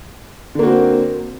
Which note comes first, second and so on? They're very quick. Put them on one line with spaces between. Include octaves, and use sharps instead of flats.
D3 A#3 F#4 C4